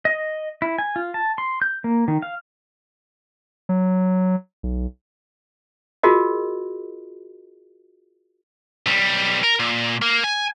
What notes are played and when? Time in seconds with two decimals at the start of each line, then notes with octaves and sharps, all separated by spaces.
0.05 D#5
0.62 E4
0.78 G#5
0.96 F4
1.14 A5
1.38 C6
1.62 G6
1.84 A#3
2.08 D#3
2.22 F5
3.69 F#3
4.63 B1
6.03 F4 F#4 G#4 A#4 D#5
8.86 B1 G3
9.44 A#4
9.60 A#2
10.02 A#3
10.24 G#5